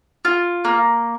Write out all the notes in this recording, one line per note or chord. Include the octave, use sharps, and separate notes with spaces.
F4
A#3